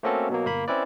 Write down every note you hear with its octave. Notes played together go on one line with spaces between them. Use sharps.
A3 A#3 C4 C#4 F#4 A4
B2 F#3 A#3
G1 A#3 B5
C4 C#4 E4 B4 D5